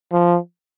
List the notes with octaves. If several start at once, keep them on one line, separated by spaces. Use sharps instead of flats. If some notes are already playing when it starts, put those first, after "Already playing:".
F3